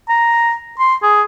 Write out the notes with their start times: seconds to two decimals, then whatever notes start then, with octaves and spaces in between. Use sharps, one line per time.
0.09 A#5
0.79 C6
1.03 G#4